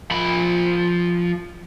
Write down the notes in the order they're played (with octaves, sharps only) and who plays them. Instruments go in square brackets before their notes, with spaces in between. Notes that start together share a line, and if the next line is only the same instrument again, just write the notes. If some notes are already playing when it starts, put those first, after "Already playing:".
[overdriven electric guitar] F3 B5